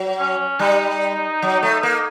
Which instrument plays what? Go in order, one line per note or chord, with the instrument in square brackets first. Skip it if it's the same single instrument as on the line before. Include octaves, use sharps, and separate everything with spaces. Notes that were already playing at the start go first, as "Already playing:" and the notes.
Already playing: [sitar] F#3
[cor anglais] C#4
[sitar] G3 [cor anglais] D#4
[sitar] F#3
A3
A#3